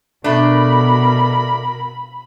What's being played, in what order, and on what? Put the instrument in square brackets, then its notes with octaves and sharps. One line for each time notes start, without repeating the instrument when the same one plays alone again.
[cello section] B2 A#4 [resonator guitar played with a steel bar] A3 D4 [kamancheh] B5